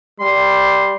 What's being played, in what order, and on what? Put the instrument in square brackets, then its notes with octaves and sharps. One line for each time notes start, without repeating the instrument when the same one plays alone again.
[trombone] G3 [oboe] C6